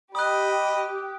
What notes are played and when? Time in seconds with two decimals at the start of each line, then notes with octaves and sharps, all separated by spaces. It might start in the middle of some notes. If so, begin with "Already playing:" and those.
0.15 G4 D#5 B5 D#6 F#6